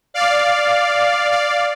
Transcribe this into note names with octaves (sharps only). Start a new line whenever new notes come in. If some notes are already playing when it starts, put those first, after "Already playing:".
D5 F5
D5 F5